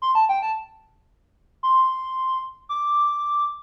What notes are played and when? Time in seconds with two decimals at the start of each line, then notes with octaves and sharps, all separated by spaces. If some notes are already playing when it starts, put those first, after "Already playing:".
0.02 C6
0.15 A5
0.29 G5
0.42 A5
1.63 C6
2.69 D6